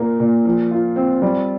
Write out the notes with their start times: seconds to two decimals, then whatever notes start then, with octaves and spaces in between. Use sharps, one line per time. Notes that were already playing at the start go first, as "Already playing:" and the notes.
Already playing: A#2 A#3
0.20 A#2
0.45 F3
0.71 F4
0.96 C4
1.22 G3